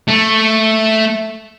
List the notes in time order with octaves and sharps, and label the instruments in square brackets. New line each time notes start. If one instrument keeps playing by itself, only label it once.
[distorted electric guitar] A3